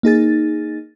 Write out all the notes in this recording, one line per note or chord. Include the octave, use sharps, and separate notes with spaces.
A#3 D#4 G#4 A6